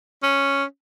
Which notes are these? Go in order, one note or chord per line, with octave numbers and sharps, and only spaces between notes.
C#4